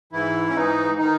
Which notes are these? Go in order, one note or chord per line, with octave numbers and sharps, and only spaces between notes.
G#2 E3 E4
C#4
G#2 E3 D#4
D#3 D#4